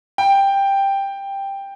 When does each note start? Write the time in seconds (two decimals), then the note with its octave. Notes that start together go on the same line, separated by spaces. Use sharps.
0.18 G5